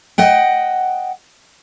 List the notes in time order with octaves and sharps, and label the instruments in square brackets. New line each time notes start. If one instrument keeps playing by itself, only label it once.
[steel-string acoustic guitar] D#5 F#5 G5